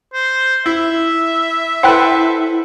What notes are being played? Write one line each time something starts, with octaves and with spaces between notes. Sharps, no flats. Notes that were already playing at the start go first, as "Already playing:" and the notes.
C5
E4 E5
E4 A4 B4 C5 F#5 G5 F#6